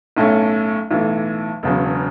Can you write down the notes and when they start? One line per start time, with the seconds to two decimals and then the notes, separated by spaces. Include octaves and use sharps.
0.17 B1 A2 A3 C#4
0.91 B1 A2 E3
1.63 E1 E2 C#3 F#3